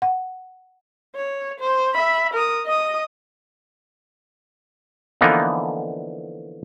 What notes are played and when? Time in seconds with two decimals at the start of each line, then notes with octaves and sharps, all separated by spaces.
0.02 F#5
1.16 C#5
1.60 C5
1.95 E5 B5
2.34 A#4 D#6
2.66 D#5 D#6
5.21 D3 E3 F3 A#3 B3 D#4